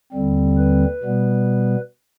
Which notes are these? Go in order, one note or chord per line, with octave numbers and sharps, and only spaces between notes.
D#2 D3 G3 C4
B4
B2 G3 B3